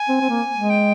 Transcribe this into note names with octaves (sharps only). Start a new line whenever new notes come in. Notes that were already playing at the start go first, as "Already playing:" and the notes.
Already playing: G#5
C4
C4
A#3
G#3
G5